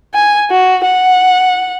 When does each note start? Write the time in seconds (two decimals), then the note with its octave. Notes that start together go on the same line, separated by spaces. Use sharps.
0.14 G#5
0.51 F#4
0.84 F#5